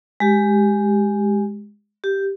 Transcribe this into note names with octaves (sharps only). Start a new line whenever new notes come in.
G#3 G4
G4